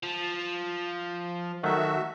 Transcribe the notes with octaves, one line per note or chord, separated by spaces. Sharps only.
F3
D#3 F#3 A3 F#4 E5